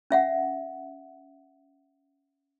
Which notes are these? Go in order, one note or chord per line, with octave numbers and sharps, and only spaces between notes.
C#4 E5 F#5